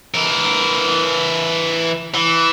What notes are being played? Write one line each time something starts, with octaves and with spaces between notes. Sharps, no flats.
E3 A#4
E3